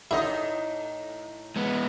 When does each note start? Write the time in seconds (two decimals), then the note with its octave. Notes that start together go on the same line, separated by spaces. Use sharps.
0.11 A2 D3 D#4 E4 D#5
1.56 G#3 B3